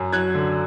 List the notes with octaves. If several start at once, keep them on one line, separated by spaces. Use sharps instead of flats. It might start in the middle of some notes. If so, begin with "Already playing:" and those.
Already playing: F#2
F#3 F#6 G#6
D3